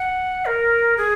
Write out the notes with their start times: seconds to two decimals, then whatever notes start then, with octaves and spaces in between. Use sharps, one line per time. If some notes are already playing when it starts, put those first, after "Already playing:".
Already playing: F#5
0.46 A#4
0.97 G#4